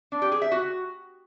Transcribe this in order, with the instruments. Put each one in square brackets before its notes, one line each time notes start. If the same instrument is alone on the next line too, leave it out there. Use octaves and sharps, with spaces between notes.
[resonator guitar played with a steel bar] D4
G4
G#4
E5
F#4